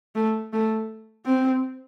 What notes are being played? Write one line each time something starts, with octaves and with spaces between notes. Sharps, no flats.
A3
A3
C4